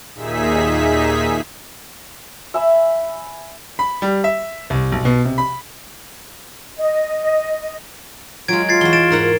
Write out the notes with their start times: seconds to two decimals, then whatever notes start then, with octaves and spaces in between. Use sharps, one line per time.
0.14 D#2 A#2 D#4 G#4 E5 B6
2.54 E5 G#5 B5 E6
3.79 B5
4.02 G3
4.24 E5
4.70 C2
4.92 B1
5.05 B2
5.25 C3
5.38 B5
6.79 D#5
8.48 F#3 G#3 F4 G#6 D7
8.69 F4 G#6 A6 C7
8.81 E2 F#4 G7
8.93 A6 D7 E7
9.10 G#2 A#4 F#5